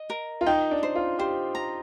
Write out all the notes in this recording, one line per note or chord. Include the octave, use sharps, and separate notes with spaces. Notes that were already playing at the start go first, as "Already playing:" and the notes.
Already playing: D#5
A#4
F4
D#4 G5
D4
C5
F4
G4 C5
A#5